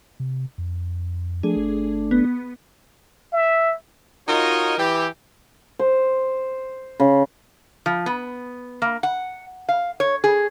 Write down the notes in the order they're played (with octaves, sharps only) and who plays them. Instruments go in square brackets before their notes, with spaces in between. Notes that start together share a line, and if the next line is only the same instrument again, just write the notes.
[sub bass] C3
F2
[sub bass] F3 [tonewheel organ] A3 D4 [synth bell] G#4
[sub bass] G1
[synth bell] B3
[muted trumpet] E5
[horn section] D#4 F4 F#4 A#4 C#5 D#5
E3 G4
[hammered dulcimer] C5
C#3
[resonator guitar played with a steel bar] F3
B3
A#3
F#5
F5
C#5
G#4